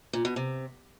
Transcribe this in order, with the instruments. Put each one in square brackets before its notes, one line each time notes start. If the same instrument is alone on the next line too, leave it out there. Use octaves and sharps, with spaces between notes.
[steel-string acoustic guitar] A#2
B2
C3